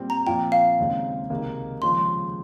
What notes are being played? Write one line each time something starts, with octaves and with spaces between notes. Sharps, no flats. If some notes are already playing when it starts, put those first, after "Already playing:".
Already playing: A#2 G3 C4
A#5
A#2 F3 C4 F4 G5
F5
D#2 C#3 G#3 C4 D#4
C#2 C3 D#3 A#3
D#2 C#3 F3 G#3 C6